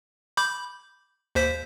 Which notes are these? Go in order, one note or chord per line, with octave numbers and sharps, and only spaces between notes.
B5 D6 G6
D#2 C5 B6